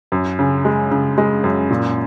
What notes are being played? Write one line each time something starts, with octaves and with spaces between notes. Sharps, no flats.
F#2
C#3
G#3
C#3
G#3
F#2
A#2